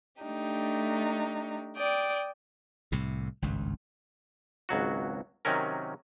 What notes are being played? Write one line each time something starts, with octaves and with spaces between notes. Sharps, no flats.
A3 D4 D#4 G4
D5 G5 D#6
C2 A2 C3
G#1 C#2 G2
G#1 C#2 F#3 F#4
C3 D#3 F#3 C#4 A#4